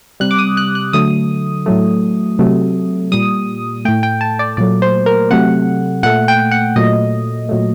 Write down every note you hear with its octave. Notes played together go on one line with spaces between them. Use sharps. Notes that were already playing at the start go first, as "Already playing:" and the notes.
C3 G3 F#6
D6
D#6
F#6
F#6
D3 F#3 A3 D#6
A2 F#3 A3
C3 F#3 A3
A#2 G3 D#6
A2 A3 G5
G5
A5
D5
A#2 F#3 A3 D5
C5
A#4
C3 F#3 A3 F#5
A#2 A3 F#5
G5
F#5
A#2 F#3 A3 D#5
A#2 F#3 A3